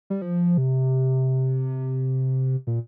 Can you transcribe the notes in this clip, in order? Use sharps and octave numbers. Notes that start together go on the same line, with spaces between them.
G3
F3
C3
A#2